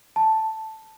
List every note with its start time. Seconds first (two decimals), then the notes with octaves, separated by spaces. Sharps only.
0.16 A5